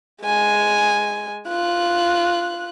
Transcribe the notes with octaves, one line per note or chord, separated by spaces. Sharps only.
G#3 G#5
F4 F#6